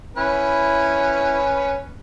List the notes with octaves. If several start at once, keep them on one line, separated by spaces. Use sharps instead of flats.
C#4 E4 B4